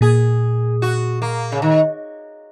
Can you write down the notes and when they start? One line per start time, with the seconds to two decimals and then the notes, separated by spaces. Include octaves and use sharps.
0.01 A#2 G#4
0.82 F#4
1.22 A#3
1.52 C#3
1.62 D#3